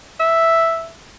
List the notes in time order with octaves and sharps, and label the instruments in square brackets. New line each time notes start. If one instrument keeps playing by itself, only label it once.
[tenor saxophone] E5